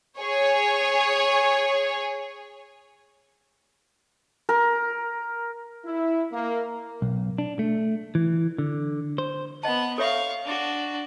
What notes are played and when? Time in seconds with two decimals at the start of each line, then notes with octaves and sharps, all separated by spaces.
0.18 G#4 C#5
4.49 A#4
5.85 E4
6.32 A#3
7.02 B1
7.38 D4
7.59 A3
8.15 E3
8.58 D3
9.18 C5
9.63 B3 D#5 F#5 A5
9.98 A4 C#5 E5 F5 C#6
10.45 D4 F#4